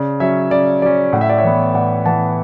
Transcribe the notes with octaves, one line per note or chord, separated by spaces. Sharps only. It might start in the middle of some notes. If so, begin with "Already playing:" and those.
Already playing: C#3 D5
F#3 C#4 C#5 E5
C#3 D5
F#3 C#4 D5
A2 F#5
E5
D5
C#5 E5
E3 B3
A2 D5 F#5
E3 B3 F#5 A5